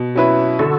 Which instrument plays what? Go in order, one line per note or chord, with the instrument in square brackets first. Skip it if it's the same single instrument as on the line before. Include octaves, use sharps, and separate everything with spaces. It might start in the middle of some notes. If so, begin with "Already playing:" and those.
Already playing: [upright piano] B2
F#3 C#4 E4 B4
[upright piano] D3 [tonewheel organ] F#4 A4